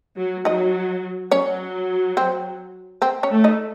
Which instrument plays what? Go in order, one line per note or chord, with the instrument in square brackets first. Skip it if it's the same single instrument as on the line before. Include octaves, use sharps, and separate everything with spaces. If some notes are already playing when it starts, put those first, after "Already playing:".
[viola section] F#3
[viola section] F#3 [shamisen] D#4 D#5
[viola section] F#3 [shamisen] C#4 C#5
[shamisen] C4 C5
C4 C5
C#4 C#5
[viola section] A3
[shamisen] D#4 D#5